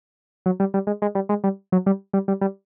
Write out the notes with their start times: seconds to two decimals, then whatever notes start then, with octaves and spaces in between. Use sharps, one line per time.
0.46 F#3
0.60 G3
0.74 G3
0.87 G#3
1.02 G#3
1.15 G3
1.29 G#3
1.44 G3
1.72 F#3
1.86 G3
2.13 G3
2.28 G3
2.41 G3